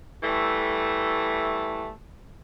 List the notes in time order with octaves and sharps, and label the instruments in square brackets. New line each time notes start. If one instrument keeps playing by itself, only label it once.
[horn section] E3 G3 A3